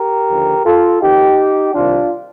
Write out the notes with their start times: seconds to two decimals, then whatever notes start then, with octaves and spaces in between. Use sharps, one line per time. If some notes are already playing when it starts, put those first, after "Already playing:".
Already playing: G4 A#4
0.28 D#2 D3 F3
0.65 F4 A4
1.01 F2 D#3 D#4 G4
1.73 C2 C3 D#3 D4 F4